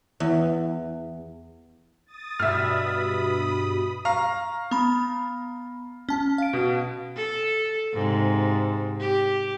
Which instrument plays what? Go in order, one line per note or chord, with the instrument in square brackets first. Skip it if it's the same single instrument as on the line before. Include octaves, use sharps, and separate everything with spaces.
[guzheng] E2
[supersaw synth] D#6 A6
[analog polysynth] G2 B2 [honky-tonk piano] E5 F6 [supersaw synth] B5 D#6
[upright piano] F5 A#5 [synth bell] C#6
[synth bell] B3 B5
C#4 A5
F5 D7
[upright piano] B2
[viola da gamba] A4
G#2 C3
G4